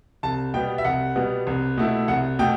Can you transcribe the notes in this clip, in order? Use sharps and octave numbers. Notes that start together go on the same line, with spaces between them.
C2 A5
B2 G3 B3 G5
E5
C2 F#5
B2 G3 B3
C2
B2 A3 E4
C2 F#5
B2 A3 G5